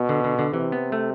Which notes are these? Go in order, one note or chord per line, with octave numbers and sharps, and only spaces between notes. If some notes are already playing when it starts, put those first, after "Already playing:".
Already playing: B2
D3
D3
D3
C3 E3
B3
A3